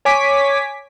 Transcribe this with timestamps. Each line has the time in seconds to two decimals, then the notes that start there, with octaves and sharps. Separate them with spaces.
0.05 C#5 G#5 D6 B6